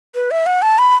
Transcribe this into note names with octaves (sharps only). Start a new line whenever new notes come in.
B4
E5
F#5
A5
B5